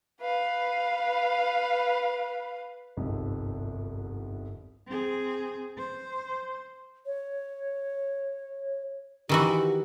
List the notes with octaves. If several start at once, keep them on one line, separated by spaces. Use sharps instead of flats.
B4 F5
G1 C2 F2 G#2
C4 G#4
C5
C#5
D#3 E3 F#4 G4